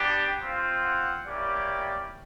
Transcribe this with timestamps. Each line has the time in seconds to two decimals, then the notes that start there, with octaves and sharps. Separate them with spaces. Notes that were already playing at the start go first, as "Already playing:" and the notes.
Already playing: B3 D4 G4
0.42 C4 F4
0.84 F#5
1.26 A#3 C#4 E4 G4 D5